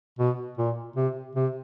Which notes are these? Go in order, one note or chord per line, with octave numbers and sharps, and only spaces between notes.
B2
A#2
C3
C3